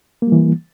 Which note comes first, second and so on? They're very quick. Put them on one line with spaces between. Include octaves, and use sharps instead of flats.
A#3 G3 E3